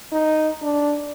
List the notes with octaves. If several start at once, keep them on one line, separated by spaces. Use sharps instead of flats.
D#4
D4